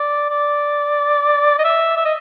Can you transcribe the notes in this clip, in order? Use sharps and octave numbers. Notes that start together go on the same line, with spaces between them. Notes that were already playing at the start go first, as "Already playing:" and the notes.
Already playing: D5
D5
D#5
E5
E5
D#5